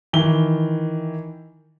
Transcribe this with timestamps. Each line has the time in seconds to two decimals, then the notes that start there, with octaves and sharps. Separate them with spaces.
0.13 D#3 E3 G7